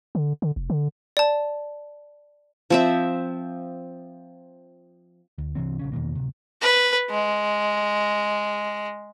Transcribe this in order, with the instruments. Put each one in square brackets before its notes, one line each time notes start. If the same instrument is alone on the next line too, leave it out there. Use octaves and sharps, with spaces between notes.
[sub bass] D3
D3
F1
D3
[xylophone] D5 A5
[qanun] F3 C4 E5
[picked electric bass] D2
C2 C3 E3 C4
A#1 C#3 C#4
E2 B2 D#3 A#3
D1 C3
[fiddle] B4
G#3